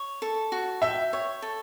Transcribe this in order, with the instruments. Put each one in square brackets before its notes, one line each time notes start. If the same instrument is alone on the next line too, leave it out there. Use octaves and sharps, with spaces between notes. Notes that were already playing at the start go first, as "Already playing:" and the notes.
Already playing: [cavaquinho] C#5
A4
F#4
[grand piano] E5 [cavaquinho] G5
[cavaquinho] C#5
A4